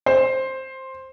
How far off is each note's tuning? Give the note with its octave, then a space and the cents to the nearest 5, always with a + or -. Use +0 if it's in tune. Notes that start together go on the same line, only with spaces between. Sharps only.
C5 +10